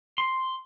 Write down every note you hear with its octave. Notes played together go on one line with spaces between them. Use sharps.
C6